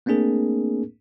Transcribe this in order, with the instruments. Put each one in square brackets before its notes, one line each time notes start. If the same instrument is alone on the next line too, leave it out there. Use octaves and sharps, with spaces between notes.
[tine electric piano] A3 A#3 C4 D4 G#4 A#4